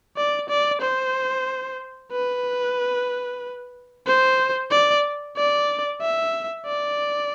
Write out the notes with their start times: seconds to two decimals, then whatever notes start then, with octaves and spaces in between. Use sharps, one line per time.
0.17 D5
0.49 D5
0.81 C5
2.12 B4
4.07 C5
4.71 D5
5.36 D5
6.01 E5
6.66 D5